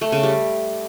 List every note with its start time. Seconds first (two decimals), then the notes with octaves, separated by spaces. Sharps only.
0.01 A3
0.12 C#3
0.23 G3